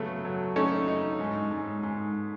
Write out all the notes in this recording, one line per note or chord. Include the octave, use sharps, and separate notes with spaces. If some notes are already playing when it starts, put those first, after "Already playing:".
Already playing: C#3 F#3 A3 B3
F#3
A3 C#4 D#4
D#4
G#2
G#2
G#2